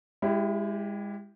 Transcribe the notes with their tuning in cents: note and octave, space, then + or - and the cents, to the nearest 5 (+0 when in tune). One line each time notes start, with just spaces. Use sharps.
G#3 -30 E4 +15 G4 +0